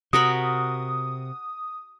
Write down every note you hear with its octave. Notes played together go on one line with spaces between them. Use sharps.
C3 F#4 A#4 B5 D#6